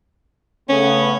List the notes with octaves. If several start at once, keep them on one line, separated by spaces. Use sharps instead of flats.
C#3 A3 B3 C#4